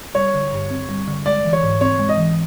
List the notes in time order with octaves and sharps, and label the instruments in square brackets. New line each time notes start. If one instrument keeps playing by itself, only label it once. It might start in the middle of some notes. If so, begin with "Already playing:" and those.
[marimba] G3 [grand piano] C#5
[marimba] D3
G2
C4
G3
D3
[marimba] G#3 [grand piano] D5
[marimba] E3
[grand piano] C#5
[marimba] G#2
[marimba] C4 [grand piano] C#5
[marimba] G#3
[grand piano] D#5
[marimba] E3